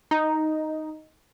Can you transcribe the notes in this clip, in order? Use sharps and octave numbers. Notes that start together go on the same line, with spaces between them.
D#4